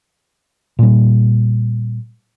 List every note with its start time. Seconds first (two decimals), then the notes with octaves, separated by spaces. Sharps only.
0.79 A#2 G3